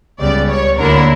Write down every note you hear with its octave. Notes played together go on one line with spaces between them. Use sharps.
C#2 C#3 G3 B3 D5
C#5
D2 D3 A#3 E4 A#4